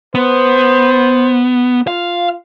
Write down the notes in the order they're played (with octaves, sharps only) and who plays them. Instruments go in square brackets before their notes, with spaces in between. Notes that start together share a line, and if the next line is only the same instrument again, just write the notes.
[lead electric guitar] B3 [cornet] C5
[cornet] F4 [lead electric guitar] F5